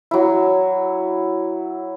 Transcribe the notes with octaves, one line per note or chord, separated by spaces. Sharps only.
F#3 E4